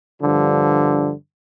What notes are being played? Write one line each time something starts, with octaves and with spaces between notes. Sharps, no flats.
G2 D3 F3